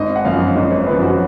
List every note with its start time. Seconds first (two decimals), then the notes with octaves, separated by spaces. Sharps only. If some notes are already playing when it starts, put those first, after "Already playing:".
Already playing: G#1 D#5
0.16 F#5
0.25 F#2 F3 F5
0.55 G#1 D#5
0.71 C#5
0.86 F#2 F3 B4
1.02 F#4